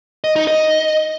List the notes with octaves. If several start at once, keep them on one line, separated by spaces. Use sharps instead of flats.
D#5
D#4
D#5